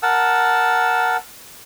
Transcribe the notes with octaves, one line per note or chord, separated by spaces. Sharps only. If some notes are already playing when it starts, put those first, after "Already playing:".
A#4 F#5 A5 E6